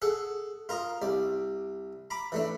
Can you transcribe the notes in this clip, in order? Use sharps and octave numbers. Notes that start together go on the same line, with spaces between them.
G#4 A4 F#5
F4 A#4 A#5 D#6
C2 D5
A#5 B5 D6
E3 A3 D4